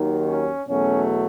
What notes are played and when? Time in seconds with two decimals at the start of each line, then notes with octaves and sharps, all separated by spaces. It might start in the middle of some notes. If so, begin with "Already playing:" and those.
Already playing: D#2 D#3 F#3
0.26 C#4
0.67 E2 B2 F#3 A3 C#4